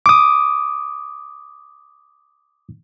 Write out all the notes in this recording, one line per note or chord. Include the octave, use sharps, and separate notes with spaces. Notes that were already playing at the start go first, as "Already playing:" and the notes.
D6 D#6